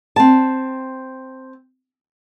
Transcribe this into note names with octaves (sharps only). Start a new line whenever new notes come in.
C4 A5